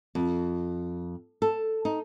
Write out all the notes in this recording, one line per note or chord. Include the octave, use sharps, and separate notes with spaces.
F2
A4
D#4